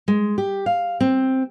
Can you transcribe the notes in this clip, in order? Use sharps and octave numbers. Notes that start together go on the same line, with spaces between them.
G#3
G4
F5
C4